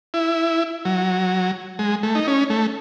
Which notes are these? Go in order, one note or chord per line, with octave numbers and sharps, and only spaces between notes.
E4
F#3
G#3
A3
D#4
C#4
A3